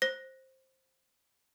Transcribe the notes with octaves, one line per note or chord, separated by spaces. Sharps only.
C5 A#6